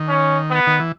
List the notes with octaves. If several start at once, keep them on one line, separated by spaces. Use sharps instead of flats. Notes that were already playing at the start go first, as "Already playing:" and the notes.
Already playing: D#3
C#4
B3
D#3
E3